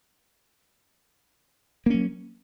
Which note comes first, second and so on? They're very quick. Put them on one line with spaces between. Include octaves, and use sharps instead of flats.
A#3 C#4 F#3